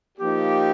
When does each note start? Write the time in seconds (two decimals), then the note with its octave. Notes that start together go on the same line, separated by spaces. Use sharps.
0.18 F3 A#3 D#4 G4